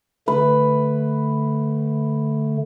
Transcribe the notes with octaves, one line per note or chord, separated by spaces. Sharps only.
D3 A3 B4